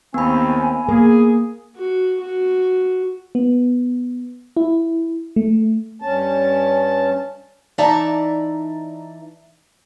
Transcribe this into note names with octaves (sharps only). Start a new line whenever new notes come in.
D#2 B3 C4 G#5 B5
A#3 G#4
F#4
F#4
B3
E4
A3
G2 C#4 A5
E3 D#4 D5 E5 A5 A#5